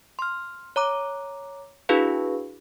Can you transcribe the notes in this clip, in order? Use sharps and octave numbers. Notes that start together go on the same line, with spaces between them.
C6 F6
C#5 A#5 D6
D4 E4 F#4 G#4 B4 F5